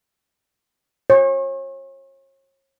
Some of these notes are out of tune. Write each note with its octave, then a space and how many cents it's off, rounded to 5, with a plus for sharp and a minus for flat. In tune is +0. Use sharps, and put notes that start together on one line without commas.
C#5 -40